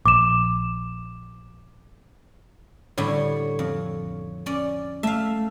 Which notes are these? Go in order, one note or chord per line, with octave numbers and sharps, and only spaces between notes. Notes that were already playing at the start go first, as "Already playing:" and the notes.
A#1 D6 E7
A2 D3 G3 C#5
F2
C#4 D5
A3 E5 F5